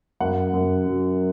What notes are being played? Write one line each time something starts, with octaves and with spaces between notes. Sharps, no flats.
F#2 F#5
F#2
F#3